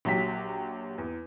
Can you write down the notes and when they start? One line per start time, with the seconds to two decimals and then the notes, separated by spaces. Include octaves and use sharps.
0.05 A#1 F#3 G4 B6
0.98 E2